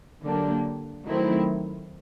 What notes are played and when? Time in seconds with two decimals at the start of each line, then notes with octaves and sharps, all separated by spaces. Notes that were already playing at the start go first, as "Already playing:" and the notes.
0.24 D3 F#3 A#3 D4 G4
1.05 D#3 F#3 A3 C4 E4